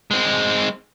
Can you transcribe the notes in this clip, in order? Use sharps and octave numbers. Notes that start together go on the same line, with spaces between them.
G#3 C4